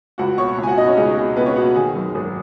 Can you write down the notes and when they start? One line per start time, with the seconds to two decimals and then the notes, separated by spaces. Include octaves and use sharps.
0.18 C#2 F#4 F#5
0.38 B2 C#5 C#6
0.58 C#2
0.63 G#5
0.67 F#4 F#5
0.77 B2 D#4 D#5
0.87 C#4 C#5
0.97 C#2 G#4
1.17 B2 G#4
1.36 C#2 B3 B4
1.46 C#4 C#5
1.56 B2 F#4 F#5
1.76 D#3 G#4 G#5
1.96 F#2
2.15 G#1